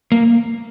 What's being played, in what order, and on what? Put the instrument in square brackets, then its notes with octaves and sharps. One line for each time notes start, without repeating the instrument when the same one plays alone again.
[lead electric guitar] A#3